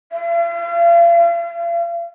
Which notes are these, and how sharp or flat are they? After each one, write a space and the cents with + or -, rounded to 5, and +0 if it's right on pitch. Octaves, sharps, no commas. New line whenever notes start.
F5 -45